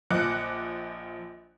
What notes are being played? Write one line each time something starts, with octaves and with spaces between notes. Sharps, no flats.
A#1 F3 D#5 D6 F#6 C#7